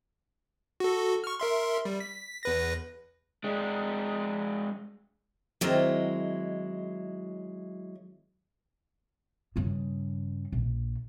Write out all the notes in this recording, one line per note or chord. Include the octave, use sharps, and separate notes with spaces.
F#4 A4
C#6 F6
A#4 E5 C6
G3
B6
E2 B4 A#6
G#3 D4
D#3 F#3 G#3 C4 E4 D5
G2 C#3
A#1